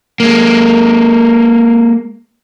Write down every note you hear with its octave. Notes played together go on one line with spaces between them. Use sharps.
G#3 A#3